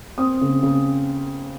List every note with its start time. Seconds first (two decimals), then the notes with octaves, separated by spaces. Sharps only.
0.18 C4 D#6
0.41 C#3
0.62 C#3